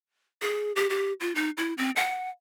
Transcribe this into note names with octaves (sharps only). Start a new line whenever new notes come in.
G#4
G4
G4
F4
D#4
E4
C4
F#5